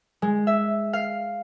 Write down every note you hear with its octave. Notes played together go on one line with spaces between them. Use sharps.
G#3
E5
F5